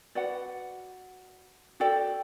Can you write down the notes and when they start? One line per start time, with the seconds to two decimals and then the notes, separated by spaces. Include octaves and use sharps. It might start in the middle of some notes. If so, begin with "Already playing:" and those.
0.15 F#4 B4 D5 F#5
1.80 F#4 A4 D5 G5